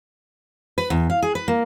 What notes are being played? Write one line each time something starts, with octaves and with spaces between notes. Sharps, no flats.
B4
E2
F5
G#4
B4
A#3